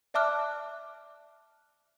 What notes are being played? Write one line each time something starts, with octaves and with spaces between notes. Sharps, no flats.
D5 E5 A5 D6 F6 F#6